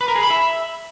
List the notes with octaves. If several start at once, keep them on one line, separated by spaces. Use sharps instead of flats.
B4
A#4
G#4
B5
E5